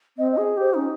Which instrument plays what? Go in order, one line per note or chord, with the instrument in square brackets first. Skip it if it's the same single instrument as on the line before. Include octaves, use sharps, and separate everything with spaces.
[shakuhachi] C4 [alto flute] D#5
[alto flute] D#5
[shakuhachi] G#4
[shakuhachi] G4 [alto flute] C5
[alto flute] C#4 [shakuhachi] D#4